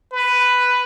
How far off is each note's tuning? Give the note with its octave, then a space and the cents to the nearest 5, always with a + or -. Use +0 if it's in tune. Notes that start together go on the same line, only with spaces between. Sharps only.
B4 +5